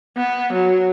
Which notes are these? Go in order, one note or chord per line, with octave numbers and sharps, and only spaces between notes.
B3
F#3